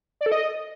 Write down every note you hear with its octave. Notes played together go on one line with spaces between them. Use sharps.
D5
A4
D#5